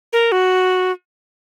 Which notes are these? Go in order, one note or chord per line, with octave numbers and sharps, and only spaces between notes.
A#4
F#4